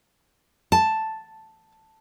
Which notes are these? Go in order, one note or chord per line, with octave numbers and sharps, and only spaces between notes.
A5